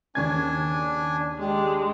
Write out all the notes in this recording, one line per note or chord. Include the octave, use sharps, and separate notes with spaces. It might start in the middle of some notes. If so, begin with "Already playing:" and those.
D#2 C#3 D4 G#5 G#6
G#3 D4 G4